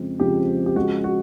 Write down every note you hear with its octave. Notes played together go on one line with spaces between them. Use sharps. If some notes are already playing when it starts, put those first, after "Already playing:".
Already playing: F2 C#3 F3 G#3 C4
F2 C#3 F3 G#3 C4 G4
G4
C#3 F3 G#3 F#4
F#4